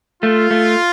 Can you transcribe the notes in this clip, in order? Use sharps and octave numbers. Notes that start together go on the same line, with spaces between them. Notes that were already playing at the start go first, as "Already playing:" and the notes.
A3 F4
A3